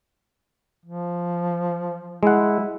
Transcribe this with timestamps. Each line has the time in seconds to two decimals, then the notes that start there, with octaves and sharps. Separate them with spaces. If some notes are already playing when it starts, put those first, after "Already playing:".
0.86 F3
2.23 G#3 E4 F#5